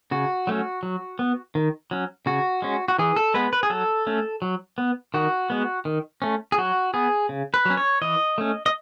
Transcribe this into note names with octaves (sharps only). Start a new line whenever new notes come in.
C#3 F#4
F#3 A3 C#4
F#3
B3
D#3
F#3 C#4
C#3 F#4
G#3 C#4
F#4
E3 G#4
A4
G#3 B3 B4
B4
G#4
F#3 A4
A3 C#4
F#3
B3
D#3 F#4
G#3 B3
D#3
A3 C#4
G#4
F#3 F#4
B3 G#4
C#3
B4
F#3 C#4
C#5
E3 D#5
A3 C#4
D#5